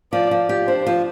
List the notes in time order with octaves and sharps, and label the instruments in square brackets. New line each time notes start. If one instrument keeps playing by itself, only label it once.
[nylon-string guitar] F3 [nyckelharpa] D5
[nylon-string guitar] F3
G4
[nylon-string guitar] D4 [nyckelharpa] C5
[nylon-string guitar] F3